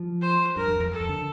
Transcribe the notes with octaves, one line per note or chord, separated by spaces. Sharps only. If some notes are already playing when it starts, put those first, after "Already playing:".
Already playing: F3
C5
G2 A#4
F2
F2
A4
F2
D3